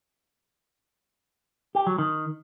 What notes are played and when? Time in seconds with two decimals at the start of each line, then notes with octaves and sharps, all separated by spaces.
1.75 G4
1.87 F#3
1.98 D#3